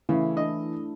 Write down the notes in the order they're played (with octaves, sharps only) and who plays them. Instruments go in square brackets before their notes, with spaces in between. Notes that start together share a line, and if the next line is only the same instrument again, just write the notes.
[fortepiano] C#3 [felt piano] E3 [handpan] A3 E4
[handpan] D4 [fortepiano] D#5